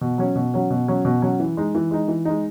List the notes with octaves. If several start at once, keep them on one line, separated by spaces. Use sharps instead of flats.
B2
F#3 C#4
B2
F#3 C#4
B2
F#3 C#4
B2
F#3 C#4
E3
G#3 D#4
E3
G#3 D#4
E3
G#3 D#4